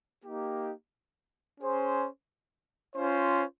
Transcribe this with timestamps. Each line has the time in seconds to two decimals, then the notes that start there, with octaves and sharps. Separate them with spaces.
0.25 A#3 D#4 G4
1.60 C#4 G#4 C5
2.96 C#4 F4 C5